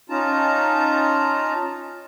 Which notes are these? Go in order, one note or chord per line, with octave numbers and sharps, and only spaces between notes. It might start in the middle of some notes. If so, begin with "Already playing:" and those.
C#4 D#4 F4 A5 A#5